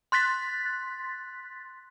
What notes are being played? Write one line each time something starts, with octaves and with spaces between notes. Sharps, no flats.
C6 F#6 A6 B6